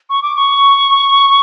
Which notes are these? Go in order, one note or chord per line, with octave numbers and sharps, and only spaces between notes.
C#6
D6
C#6